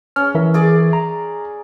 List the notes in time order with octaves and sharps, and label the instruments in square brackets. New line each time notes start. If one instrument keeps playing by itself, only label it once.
[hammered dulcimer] C#4 [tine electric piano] F6
[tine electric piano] E3 A#4 E5
[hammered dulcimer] G#4 D5
[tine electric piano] A#5